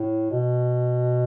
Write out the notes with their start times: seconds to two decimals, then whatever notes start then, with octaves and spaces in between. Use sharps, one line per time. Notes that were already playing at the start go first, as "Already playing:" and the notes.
Already playing: A2
0.31 B2